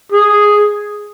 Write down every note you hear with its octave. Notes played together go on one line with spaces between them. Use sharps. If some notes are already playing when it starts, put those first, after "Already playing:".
G#4